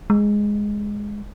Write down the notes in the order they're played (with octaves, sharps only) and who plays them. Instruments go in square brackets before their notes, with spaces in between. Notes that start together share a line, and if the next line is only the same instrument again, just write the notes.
[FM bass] G#3